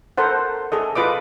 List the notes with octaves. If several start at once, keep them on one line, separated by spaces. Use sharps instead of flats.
A4 A#4 C5 F#5
G#4 A4 D#5
F4 B4 D#5 D6